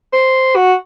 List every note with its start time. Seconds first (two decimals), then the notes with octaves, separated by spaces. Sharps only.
0.13 C5
0.56 F#4